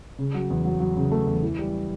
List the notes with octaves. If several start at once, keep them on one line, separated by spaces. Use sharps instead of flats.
C#3
F#3
E2
F#3
F#3
C#3
A3
E2
E3
G3